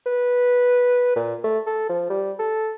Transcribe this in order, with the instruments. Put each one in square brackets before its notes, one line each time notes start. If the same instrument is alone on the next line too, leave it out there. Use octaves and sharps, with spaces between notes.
[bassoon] B4
A#2
A3
A4
F3
G3
A4